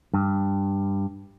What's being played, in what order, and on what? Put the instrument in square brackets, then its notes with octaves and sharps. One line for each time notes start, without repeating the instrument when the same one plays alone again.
[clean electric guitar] G2